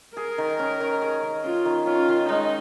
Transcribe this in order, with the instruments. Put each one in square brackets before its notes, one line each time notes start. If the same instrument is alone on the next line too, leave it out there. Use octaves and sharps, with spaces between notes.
[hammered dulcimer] G#4 [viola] A#4
[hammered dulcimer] D#3
C#4
D#3
G#4
D#3
[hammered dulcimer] C#4 [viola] F4
[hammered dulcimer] D#3
[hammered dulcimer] C#4 [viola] F4
[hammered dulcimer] D#3
[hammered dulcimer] G#3 [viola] D#4